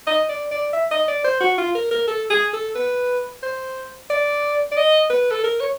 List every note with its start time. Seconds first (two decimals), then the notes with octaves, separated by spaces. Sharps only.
0.07 D#5
0.29 D5
0.51 D5
0.73 E5
0.91 D#5
1.08 D5
1.24 C5
1.40 F#4
1.58 F4
1.75 A#4
1.91 A#4
2.07 A4
2.30 G#4
2.53 A4
2.75 B4
3.43 C5
4.10 D5
4.71 D5
4.77 D#5
5.10 B4
5.31 A4
5.44 A#4
5.60 C#5